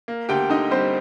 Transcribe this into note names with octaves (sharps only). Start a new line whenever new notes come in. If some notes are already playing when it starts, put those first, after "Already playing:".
A#3
D2 G4 G5
D3 D#4 D#5
G3 C4 C5